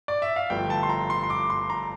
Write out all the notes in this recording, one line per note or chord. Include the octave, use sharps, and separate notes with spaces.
D5
E5
F5
G1 G2 F3 A3 E4 G5
A5
C6
A#5
C6
C6
D6
C6
A#5